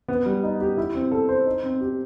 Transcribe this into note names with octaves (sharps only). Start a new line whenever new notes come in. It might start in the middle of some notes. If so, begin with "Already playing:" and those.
B3
G3
D#4
G4
E4
C4
A4
C5
D#4
C4
G4